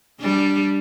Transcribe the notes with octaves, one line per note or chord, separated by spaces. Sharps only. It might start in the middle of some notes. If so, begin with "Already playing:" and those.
G3 D4